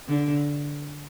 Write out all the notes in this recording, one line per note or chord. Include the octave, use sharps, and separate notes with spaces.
D3